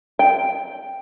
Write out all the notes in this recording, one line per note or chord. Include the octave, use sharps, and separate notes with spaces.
G5